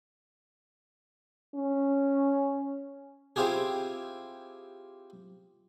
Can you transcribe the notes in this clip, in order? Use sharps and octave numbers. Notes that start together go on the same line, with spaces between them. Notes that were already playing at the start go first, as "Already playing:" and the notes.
C#4
C4 E4 F4 G4 G#4